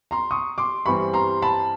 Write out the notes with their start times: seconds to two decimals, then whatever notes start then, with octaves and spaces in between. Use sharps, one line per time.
0.11 A#5 C6
0.31 C#6 D#6
0.58 C6 D6
0.86 G2 E3 G3 C4 B5 C#6
1.13 A#5 C6
1.42 A5 B5